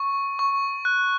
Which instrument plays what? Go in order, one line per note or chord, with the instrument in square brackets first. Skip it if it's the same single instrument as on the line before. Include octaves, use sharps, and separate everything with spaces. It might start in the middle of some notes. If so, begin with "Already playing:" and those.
Already playing: [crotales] C#6
C#6
F#6